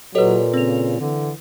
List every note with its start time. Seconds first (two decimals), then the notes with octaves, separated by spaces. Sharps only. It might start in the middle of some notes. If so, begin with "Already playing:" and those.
0.15 A#2 F#3 G4 A4 B4 C#5 D#5
0.54 C#3 C4 F7
1.00 D3 E3